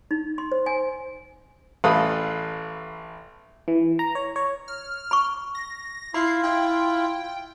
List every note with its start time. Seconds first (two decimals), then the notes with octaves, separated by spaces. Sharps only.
0.11 D#4
0.38 C6
0.52 C5
0.66 G#5
1.84 A1 A4 B4 F5 D#6
3.68 E3
3.99 A#5
4.15 C#5
4.36 C#5
4.68 F6
5.11 B5 C#6
5.55 A#6
6.14 E4 F4 B5 C7
6.43 E4 G5